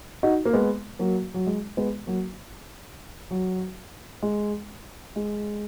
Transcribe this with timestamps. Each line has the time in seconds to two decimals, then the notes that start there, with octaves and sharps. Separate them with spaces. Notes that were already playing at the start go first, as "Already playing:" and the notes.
0.23 D#4 F#4
0.45 A#3
0.53 G#3 B3
0.99 F#3 A#3
1.34 F#3
1.46 G#3
1.77 G#3 B3
2.07 F#3 A#3
3.31 F#3
4.22 G#3
5.16 G#3